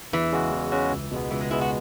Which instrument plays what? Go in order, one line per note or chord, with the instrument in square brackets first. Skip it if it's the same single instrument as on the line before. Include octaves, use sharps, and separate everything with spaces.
[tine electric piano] E2 [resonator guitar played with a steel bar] E3
[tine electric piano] C#3 G#3 C#4 F#4
E2
C#3 G#3 C#4 F#4
C#2
B2 G#3 B3
[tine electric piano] C#2 [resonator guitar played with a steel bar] E3
[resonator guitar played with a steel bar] G#3
[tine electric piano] B2 G#3 B3 [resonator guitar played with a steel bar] E4
[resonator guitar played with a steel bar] F#4